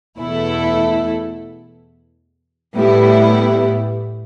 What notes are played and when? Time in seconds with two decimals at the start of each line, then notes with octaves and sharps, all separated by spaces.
0.18 E2 B2 A3 E4 A4
2.76 A2 G3 B3 E4